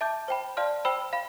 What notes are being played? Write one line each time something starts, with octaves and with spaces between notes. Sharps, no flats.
E5 A5 D6 G6
C5 G5 B5
D5 F5 A5 C6 F6
C5 G5 B5 E6
F5 B5